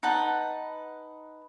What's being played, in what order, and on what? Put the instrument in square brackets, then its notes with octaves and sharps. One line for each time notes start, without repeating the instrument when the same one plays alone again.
[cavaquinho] D#4 B4 F#5 A5